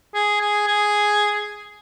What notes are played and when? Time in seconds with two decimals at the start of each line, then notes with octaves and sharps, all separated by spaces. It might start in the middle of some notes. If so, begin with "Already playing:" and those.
0.14 G#4
0.41 G#4
0.68 G#4